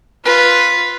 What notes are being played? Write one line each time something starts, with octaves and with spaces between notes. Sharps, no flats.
F4 B4